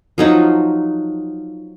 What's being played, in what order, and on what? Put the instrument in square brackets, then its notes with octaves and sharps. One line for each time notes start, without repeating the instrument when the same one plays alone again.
[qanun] F3 F#3 D#4 F4